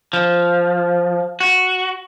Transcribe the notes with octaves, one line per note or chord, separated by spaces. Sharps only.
F3
F#4